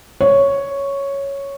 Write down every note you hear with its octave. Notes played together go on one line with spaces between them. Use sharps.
C#5